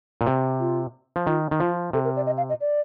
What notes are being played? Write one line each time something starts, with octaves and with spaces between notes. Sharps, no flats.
A#2
C3
F4
F3
D#3 F4
D#3
F3 F4
C3 A4
A#4
D5
D#5
F5
D#5
D5